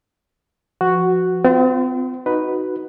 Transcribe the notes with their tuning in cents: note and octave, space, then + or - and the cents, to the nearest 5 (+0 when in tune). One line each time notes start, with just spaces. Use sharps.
F3 +0 F#4 +0 B4 +25
C4 -40 F4 +5
D#4 +0 F#4 +0 B4 +0